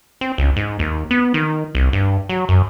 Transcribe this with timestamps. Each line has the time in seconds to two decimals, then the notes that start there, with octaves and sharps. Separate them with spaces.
0.21 C4
0.38 C#2
0.56 G#2
0.79 D#2
1.11 B3
1.34 D#3
1.75 C2
1.93 G2
2.29 F#3
2.49 F#2